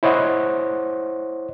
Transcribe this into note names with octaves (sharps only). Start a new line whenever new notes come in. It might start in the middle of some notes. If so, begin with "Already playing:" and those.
E4 C5 C#5 D#5 F#5